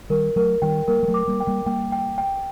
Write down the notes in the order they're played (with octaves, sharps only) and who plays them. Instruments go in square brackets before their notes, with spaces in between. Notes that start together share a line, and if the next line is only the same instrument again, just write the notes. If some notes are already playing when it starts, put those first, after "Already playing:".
[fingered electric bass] D#3 G3 [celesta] A#4
[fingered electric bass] F#3 A3 [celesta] A#4
[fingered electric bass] D#3 G3 [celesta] G5
[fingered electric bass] G3 A#3 [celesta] A#4
[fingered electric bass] G3
F#3 A3
[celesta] D6
[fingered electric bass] G3 A#3
[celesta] G5
[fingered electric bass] G3 A#3
[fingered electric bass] G3 A#3 [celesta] G5
[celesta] G5
G5